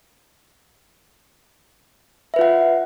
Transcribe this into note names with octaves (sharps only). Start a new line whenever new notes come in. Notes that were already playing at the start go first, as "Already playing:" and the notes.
F4 B4 E5 F#5